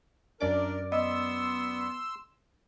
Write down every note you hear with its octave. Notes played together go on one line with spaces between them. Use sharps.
F#2 D4 A#4 D5 D6
B3 D#5 C6 E6